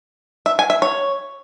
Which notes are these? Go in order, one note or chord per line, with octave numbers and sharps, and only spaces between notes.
E5
G#5
E5
C#5